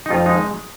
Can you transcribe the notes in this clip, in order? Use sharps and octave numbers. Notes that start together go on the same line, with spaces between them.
D#4
F2 F4
G#3 D#4